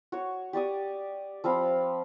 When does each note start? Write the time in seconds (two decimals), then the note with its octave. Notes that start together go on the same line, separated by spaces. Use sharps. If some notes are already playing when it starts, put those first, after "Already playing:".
0.12 F#4 C#5
0.53 G4 D5 C#6 D#6
1.44 F3 C4 F5 B5